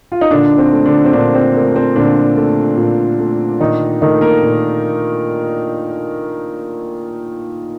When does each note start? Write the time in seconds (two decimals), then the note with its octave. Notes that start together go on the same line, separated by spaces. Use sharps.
0.12 F4
0.21 D#4
0.31 A#2 D3 D4
0.58 C4
0.73 A3
0.86 D3 D4
1.05 C4
1.13 A#2 D3 D4
1.35 C4
1.55 A3 A#3
1.76 C4
1.96 A#2 D3 D4
2.37 A3
2.77 A#2
3.19 A3
3.60 A#2 D#3 D#4
4.01 D#3 A3 D#4
4.21 A#3 A#4
4.43 A#2